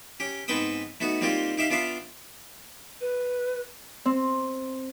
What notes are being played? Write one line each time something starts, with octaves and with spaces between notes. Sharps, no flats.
C#4 G4
G#2 B3 C4 B4 G5 D#6
A3 B3 D#4 F#4
G3 A#3 C4 D#4 F4 G4
D#4 G4 E5 F5
B3 D4 F4 D5 E5 F5
B4
C4